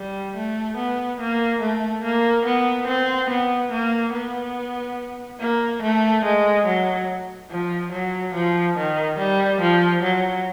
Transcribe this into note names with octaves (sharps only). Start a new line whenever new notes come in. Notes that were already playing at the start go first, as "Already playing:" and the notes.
Already playing: G3
A3
B3
A#3
A3
A#3
B3
C4
B3
A#3
B3
A#3
A3
G#3
F#3
F3
F#3
F3
D#3
G3
F3
F#3